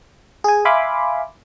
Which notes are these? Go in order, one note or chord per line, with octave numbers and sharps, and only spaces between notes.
G#4 G#5
E5 F5 G#5 B5 C6 D6